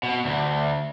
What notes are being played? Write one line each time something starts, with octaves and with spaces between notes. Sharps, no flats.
B2
D2